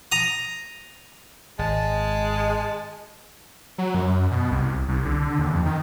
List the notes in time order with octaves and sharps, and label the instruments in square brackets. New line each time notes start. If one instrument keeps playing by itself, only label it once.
[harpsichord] A#5 D#6
[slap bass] G#1 [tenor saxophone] G#3 [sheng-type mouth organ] A5
[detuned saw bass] F#3
F#2
B2
C2
C2
D3
D#2
F2
D#3